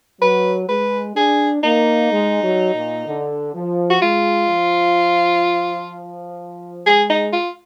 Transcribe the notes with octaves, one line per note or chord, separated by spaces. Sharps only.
F#3 B4
G#3 B4
D4 G#4
A#3 D#4
G#3
F#3
A#2
D3
F3
F#4
G#3 F4
F3
G#3 G#4
D#4
F4